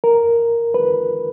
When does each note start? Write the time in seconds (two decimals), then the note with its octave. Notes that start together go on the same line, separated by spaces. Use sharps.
0.04 A#4
0.74 B4